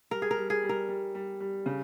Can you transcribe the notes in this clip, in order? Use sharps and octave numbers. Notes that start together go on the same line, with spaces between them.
G3 A#4
G#4
A#4
G3
G#4
G3
A#4
G3
G3
G3
C#3